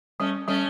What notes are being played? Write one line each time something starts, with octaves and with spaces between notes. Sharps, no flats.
G3 A3 C#4
G3 A3 C#4